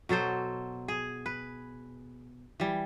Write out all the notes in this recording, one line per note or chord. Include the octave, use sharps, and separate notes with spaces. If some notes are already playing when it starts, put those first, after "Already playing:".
B2 F#3 A4 C5
G#4
B4
E3 G3